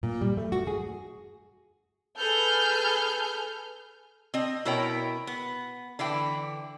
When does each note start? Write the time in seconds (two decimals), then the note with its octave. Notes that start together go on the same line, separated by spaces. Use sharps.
0.03 A#2
0.21 G3
0.37 A3
0.52 F#4
0.67 G#4
2.18 G#4 A4 B4 F6 G6
4.34 C4 D#5
4.65 B2 E4 A#4 C#5 G5
5.27 B3
5.99 D3 E3 E4 G5